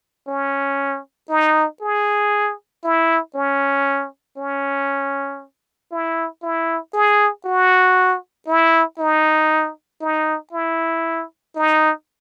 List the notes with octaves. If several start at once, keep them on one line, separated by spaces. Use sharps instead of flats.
C#4
D#4
G#4
E4
C#4
C#4
E4
E4
G#4
F#4
E4
D#4
D#4
E4
D#4